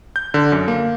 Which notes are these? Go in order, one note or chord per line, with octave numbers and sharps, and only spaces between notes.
G6
D3
F#2
A#3